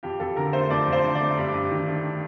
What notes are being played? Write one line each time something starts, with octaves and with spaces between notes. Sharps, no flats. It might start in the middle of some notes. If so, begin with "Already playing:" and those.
F2 G4
F2 A4
D3 A#4
A3 C5
F2 D5
F2
C5
D3
D5
A3
G2
G2
D#3
A3